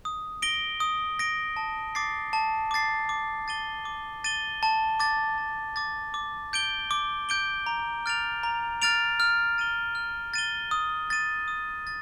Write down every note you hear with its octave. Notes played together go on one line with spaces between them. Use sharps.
D#6
A#6 D7 G7
D#6
A#6 D7 G7
A5
D6 A6 C7
A5
D6 A6 C7
D6
A6 D#7 G7
D6
A6 D#7 G7
A5
D6 A6
A5
D6 A6
D6
G6 D7 G7
D6
G6 D7 G7
A#5
F6 A6 D7 F7
A#5
F6 A6 D7 F7
F6
A6 D#7 G7
F6
A6 D#7 G7
D#6
A6 D#7
D#6
A6